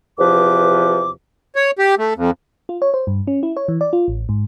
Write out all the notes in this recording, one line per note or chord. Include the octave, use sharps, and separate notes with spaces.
E2 C3 F3 B4 D6
C#5
G4
A3
F2
F4
C#5
C5
G2
C#4
E4
C#5
E3
D5
F4
A1
G#2